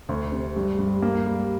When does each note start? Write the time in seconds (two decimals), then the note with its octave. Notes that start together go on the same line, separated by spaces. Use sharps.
0.09 D2
0.32 C3
0.56 G2
0.79 G2
1.02 A#3
1.26 G3